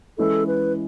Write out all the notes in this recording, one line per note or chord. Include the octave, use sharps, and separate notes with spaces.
E3 G#3 C#4 E4 A4
B4